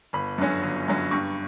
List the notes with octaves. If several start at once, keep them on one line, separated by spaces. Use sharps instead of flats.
G1 B5
F#2 D3 F#3 C#4
G1
F#2 D3 F#3 C#4
G2 C#6